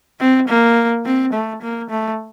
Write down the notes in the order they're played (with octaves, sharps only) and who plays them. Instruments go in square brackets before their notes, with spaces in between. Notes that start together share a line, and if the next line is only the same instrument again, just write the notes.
[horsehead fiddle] C4
A#3
C4
A3
A#3
A3